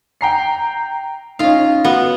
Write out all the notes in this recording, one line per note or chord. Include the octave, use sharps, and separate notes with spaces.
G5 A#5 C7
C#4 D#4 F4 F5
B3 F#4